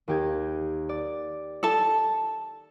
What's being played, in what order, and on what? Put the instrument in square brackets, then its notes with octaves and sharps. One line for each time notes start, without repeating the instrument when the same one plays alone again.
[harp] D#2 G4 G#6
D5
[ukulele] A4 A5